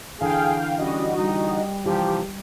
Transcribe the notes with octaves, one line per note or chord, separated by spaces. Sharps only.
D3 E3 G#4 F5 G5
G3 C#4 F#4 D#5
G3 D#4
C3 E3 F3 G4